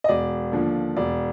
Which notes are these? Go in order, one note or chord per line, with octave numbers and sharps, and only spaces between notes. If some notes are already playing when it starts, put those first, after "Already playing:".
D#5
E1 D5
D#2 D3 F3
E1 D5